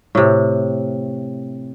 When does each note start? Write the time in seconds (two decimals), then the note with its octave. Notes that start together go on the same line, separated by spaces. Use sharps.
0.15 A2 C3